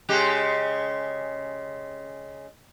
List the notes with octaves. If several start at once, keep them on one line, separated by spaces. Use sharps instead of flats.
C#3 G#3 G4